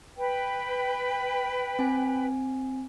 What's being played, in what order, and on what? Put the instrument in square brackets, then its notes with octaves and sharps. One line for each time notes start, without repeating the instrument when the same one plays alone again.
[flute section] B4 G5
[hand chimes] C4 G#5